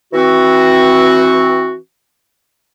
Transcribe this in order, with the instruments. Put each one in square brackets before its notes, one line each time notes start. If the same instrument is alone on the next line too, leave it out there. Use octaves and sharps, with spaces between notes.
[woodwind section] E3 C4 F#4